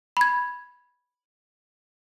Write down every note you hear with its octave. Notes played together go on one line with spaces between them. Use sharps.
B5 G#6